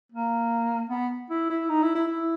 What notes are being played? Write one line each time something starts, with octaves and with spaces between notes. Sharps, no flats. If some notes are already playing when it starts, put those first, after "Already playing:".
A#3
B3
E4
E4
D#4
E4
E4
E4